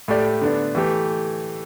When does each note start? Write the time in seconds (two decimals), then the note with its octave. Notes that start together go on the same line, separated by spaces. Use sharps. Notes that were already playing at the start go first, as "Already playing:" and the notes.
0.08 A2 A3 G4 D5
0.42 D3 B3 D4
0.75 E3 A3 G4